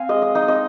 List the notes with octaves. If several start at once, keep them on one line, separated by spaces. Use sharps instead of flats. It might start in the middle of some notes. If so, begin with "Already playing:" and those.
Already playing: C4 F5 G#5
G#3 D#5
D#5
D#4 D#5
D#5